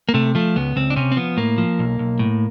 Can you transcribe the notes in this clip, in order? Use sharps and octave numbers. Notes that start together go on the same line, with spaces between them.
A#3
C3 A3
F3 A3
C#2 B3
C#2 C4
D4
C3 C#4
C4
F3 B3
A2 A#3
F3
B1
B1
A2